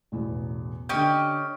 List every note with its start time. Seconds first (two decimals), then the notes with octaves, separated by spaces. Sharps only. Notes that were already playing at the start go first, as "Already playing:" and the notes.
0.12 A1 E2 B2
0.89 D3 C#4 G4 D#5 G5 G6